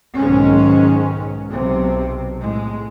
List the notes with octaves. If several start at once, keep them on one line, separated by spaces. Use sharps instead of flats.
B1 G#2 D#3 G#3 C#4
B1 C3
A2 G#3